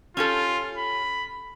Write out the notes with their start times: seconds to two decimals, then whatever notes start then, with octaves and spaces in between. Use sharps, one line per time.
0.17 C#4 F4 G4 A4
0.78 B5